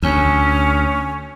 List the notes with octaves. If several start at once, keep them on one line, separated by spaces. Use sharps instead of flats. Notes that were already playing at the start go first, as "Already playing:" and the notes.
D2 C#4